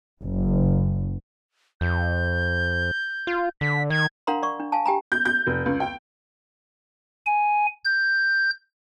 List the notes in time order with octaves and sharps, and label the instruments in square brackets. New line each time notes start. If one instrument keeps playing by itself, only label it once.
[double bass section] F#1
[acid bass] F2 [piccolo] G6
[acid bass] F4
[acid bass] D3 [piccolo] B6
[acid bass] D#3 [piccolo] G#6
[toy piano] D4 A#4 F5 F#5 A#5 C6
D5 C#6
D4
F5 G#5 A5
G4 G5 G#5 A#5
[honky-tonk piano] G6
G6
F1
C#2
G5
[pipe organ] G#5
G6